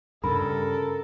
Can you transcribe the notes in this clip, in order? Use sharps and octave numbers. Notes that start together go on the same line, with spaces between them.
G2 C#3 A4 A#4 B5